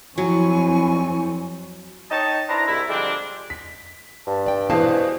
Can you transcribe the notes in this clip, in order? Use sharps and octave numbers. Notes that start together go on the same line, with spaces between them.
F2 F#3 C4 E4 G#5 C#6
D#4 C#5 D#5 G5 A5
D4 E4 B4 C5 A#5
C2 G#2 E4
D3 F3 G3 G#3 C4 D4
B6
G2 A5
D5 G5
B2 E3 G#4 B4 C5 F5 A5